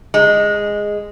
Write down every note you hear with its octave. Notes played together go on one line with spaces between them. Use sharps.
G#3